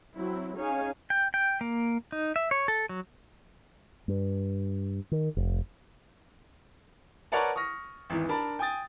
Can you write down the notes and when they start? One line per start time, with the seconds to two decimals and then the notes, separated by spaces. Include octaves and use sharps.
0.14 F#3 C4 E4
0.56 C#4 D#4 G#4 C#5 F5 G#5
1.10 G5
1.34 G5
1.61 A#3
2.12 D#4
2.36 E5
2.51 C#5
2.68 A4
2.89 F#3
4.08 G2
5.12 D#3
5.37 F1
7.32 A#4 B4 C#5 D5 F#5 A5
7.56 C#6 D#6 F6 A#6
8.10 G#1 E2 E3
8.29 D4 A#4 A5 B5
8.59 G5 G#5 D#6 A6